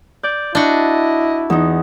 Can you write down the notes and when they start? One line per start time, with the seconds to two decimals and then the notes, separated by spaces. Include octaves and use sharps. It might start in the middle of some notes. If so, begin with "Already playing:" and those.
0.23 D5 G6
0.55 D4 E4 F#4 D#5
1.50 E2 D#4